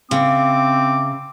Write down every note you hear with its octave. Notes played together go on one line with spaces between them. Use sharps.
C#3 C4 E5 D6